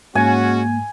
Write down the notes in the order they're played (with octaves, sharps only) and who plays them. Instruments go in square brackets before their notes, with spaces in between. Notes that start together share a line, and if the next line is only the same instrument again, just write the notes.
[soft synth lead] G#2 [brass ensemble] G#3 C#4 F#4 [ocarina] A#3 [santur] G#5